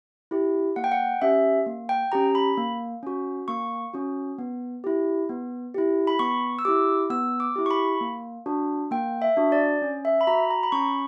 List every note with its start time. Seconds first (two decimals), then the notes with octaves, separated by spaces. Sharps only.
0.31 E4 G4
0.76 A#3 F#5
0.84 G5
0.92 F#5
1.22 C#4 G4 E5
1.66 A#3
1.89 G5
2.12 C#4 G4 A#5
2.35 B5
2.57 A#3
3.03 C#4 F#4
3.48 A#3 C#6
3.93 C#4 F#4
4.38 B3
4.84 E4 G4
5.29 B3
5.74 E4 G4
6.07 B5
6.19 B3 C#6
6.59 E6
6.65 E4 G4 D6
7.10 B3 E6
7.40 D6
7.56 E4 G4
7.66 C#6
7.71 B5
8.01 A#3
8.46 D4 F#4
8.91 A#3 G5
9.22 E5
9.37 D4 F#4
9.52 D5
9.82 C#4
10.05 E5
10.21 B5
10.27 F#4 A#5
10.50 A#5
10.63 B5
10.72 C#4 C#6